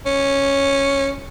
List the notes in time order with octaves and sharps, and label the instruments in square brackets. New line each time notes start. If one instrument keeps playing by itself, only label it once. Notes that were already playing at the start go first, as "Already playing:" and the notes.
[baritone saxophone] C#4